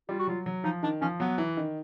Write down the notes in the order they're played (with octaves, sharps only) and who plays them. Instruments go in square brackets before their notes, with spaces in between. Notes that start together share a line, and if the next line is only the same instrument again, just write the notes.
[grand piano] G3 [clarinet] F4
[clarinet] F#4
[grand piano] F#3 [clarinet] F4
[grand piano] F#3
[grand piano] F3 [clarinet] D#4
[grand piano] D#3 [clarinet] D4
[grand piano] F3 [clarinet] C#4
[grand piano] F#3 [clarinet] B3
[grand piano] E3
D#3